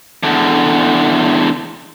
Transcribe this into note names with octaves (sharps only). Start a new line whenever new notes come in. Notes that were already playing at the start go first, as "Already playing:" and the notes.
E2 D3